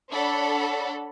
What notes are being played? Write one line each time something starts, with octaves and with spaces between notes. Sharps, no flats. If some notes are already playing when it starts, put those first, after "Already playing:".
D4 A4 C#5 F#5 B5